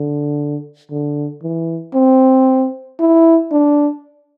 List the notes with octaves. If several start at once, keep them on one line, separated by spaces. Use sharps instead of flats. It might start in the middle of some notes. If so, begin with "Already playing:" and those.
Already playing: D3
D3
E3
C4
E4
D4